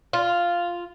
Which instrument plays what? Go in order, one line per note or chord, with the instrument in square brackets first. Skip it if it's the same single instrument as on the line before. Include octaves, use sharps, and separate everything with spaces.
[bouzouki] F4